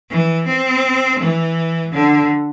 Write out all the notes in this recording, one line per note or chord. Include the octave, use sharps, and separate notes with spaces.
E3
C4
E3
D3